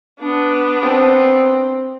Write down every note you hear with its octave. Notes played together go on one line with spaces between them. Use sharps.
B3 D4
C4